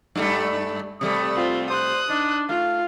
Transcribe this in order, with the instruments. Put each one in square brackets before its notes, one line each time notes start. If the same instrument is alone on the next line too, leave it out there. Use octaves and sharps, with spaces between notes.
[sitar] G2 G3 A3
[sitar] C3 G3 A3 [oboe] D#6
[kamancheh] C4 F4
[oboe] C5 [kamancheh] D#6 F#6
[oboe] D4 [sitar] D#4
[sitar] A3 [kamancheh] F4 [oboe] F5